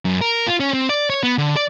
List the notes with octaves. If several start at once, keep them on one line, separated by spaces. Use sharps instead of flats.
F#2
A#4
F4
C#4
C4
D5
C#5
B3
D3
D5